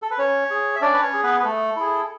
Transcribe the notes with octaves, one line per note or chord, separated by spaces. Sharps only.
A4
B4
C#4 C#5
G#4
E5
C#4 D4 D5
B4
C#4 C#5
G#4
B3 B4
B4
A3 A4
E4 G#4